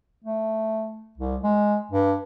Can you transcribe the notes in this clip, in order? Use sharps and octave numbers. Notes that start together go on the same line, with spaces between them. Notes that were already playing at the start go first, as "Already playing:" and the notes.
A3
C2
G#3
G2